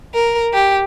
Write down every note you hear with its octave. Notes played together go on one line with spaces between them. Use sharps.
A#4
G4